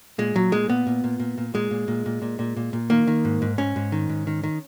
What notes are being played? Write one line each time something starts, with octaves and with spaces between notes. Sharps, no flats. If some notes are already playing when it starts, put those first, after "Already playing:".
A#2 G#3
A#2 F#3
A#2 G#3
A#2 B3
A#2
A#2
A#2
A#2
A#2 G#3
A#2
A#2
A#2
A#2
A#2
A#2
A#2
D#3 A#3
D#3
G#2
G#2
G#2 C#4
G#2
D#3
G#2
D#3
D#3